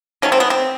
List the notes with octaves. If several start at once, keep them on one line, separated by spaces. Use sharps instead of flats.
D#3 F#3 A3 C#4
C4
B3
C4